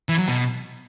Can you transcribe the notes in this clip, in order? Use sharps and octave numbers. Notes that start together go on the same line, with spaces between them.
E3
F#3
B2